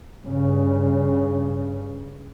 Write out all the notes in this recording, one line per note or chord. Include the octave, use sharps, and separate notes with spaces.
G2 C#3